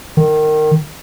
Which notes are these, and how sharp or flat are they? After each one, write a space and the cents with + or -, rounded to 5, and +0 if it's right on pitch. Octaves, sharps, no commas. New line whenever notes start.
D#3 -20